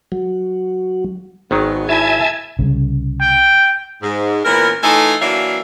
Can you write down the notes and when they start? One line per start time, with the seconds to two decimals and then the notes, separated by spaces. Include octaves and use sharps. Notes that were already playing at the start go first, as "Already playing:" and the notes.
0.12 F#3
1.51 G#1 D#3 F#3 G#3 B3
1.89 E4 E5 G#5 A5 G#6
2.59 C2 C#3
3.21 G5
4.02 G#2
4.45 A#2 E3 B3 C#4 A#4
4.83 E3 A3 D#4 F4 A4 G#5
5.22 E3 F#3 A#3 D4 E5 F5